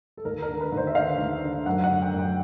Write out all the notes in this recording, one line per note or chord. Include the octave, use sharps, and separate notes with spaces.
A4
D#2 A#4
A#4
D3
B4
D#2
C5
E5
D3 F5
D#2
D3
F#2 F#5
F#5
D3
G5
F#2
G5